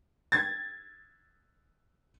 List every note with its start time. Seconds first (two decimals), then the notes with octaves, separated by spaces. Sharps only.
0.32 G#6 A6